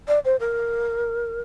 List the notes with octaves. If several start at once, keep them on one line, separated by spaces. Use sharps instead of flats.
D5
C5
A#4